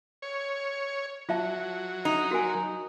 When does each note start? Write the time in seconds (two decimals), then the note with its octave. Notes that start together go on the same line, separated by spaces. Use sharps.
0.22 C#5
1.29 F#3 F4 E5 A5
2.05 D#4
2.31 F#4 A#4 G#5